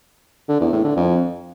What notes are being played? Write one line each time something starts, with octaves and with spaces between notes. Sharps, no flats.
D3
E2
A2
D3
F2